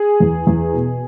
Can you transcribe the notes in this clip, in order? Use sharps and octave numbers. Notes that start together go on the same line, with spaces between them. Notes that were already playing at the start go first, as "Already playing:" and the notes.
Already playing: G#4
E2
E2
B2